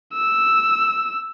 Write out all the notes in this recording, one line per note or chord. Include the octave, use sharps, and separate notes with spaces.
E6